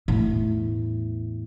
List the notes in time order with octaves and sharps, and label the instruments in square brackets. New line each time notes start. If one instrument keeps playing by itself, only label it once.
[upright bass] E2 A2